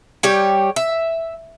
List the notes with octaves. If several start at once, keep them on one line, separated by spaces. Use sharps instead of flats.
G3 G4 C#5
E5